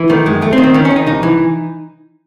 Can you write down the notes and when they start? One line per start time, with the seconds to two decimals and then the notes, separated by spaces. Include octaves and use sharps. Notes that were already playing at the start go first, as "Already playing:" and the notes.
Already playing: E3
0.09 D#3 A3
0.26 F#2 G#3
0.42 D#2 A3
0.53 C4
0.58 D#3
0.63 C4
0.74 D#3 C#4
0.85 C#4
0.91 D#3
0.96 D#4
1.07 C2 D#4
1.23 E3